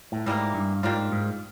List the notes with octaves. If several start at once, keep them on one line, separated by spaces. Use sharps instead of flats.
A2
G#2 E3 G3 A#3
G2
G#2 G3 A#3 D4 F4
G#2